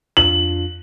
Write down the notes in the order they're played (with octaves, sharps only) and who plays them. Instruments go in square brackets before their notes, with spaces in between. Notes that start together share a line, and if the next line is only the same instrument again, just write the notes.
[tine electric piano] F2 D4 F4 [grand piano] F#7